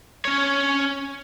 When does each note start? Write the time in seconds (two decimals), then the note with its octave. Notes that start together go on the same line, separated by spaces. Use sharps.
0.25 C#4 C#5